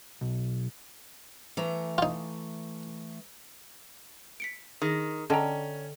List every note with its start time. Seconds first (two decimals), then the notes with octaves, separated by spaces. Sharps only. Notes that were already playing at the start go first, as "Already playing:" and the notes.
0.21 B1
1.57 E3 A3 A#5
1.98 D#4 F4
4.40 B6 C#7 D7
4.82 D#3 G#4 A#6
5.30 D3 C#4 D#5 G5 A#5